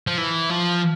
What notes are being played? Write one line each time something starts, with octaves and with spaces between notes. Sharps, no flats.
F3
E3
F3